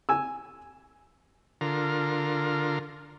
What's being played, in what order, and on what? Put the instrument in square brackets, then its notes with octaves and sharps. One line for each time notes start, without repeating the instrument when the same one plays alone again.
[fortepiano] G#5 E6
[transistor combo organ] D3 F4 A#4